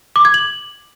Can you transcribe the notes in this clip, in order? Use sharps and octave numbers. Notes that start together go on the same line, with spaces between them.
D6
G#6
F#7